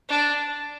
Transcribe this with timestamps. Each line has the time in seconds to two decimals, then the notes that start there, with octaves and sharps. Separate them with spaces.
0.09 D4